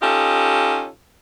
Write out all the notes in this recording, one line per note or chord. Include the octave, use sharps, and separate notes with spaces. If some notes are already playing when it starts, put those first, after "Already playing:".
C#4 D#4 F4 G4 A4